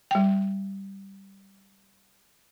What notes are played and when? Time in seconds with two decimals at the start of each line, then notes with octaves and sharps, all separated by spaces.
0.11 G3 G5